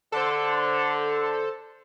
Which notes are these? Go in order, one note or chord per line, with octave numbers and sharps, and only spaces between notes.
D3 A4 C5